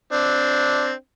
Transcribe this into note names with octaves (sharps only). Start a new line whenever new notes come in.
C4 D4